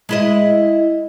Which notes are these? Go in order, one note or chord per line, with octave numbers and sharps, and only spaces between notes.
G#3 E4 D#5